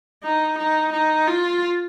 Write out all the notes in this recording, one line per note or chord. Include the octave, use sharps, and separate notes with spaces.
D#4
D#4
D#4
F4